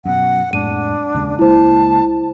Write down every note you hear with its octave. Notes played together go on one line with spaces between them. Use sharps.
F#2 B2 F#5
F2 A2 G#3 D4 D#7
D#2 C#3 G#3
C#2 G#3 A#3 E4 C5 A5